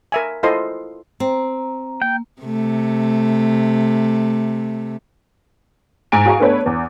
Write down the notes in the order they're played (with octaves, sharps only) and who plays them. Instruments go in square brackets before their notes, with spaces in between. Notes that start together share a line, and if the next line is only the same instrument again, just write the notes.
[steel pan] A#4 E5 G#5
E4 F4 A4 C5 D#5 C6
[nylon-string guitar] C4 [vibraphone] A#5
[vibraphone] A#3 [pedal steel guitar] G5
[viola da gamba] C3 A3
[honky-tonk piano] G#2 G#5 D7
F#4 G#4 F5 G#5 A#5 C#6
A3 B3 D4 A4 B4 C#5
E2